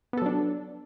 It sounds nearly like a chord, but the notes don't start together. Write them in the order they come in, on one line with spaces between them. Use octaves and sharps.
B3 A4 F#3 D4